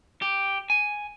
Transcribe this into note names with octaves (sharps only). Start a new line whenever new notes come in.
G4
G#5